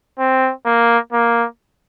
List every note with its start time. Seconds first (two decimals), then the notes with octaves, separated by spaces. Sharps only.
0.19 C4
0.66 A#3
1.13 A#3